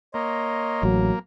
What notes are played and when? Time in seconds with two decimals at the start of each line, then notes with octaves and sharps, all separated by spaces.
0.14 A#3 C#5 D#5 C6
0.83 A1 F#3